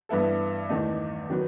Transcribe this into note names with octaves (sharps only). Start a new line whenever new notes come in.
G2 E3 B3 E4 A4
E2 D#3 A3 D#4
D#3 F#3 B3